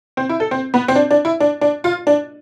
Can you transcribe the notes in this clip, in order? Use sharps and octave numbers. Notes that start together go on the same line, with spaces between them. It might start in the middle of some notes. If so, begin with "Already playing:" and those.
C4
E4
A4
C4
B3
C4
D4
D4
E4
D4
D4
F4
D4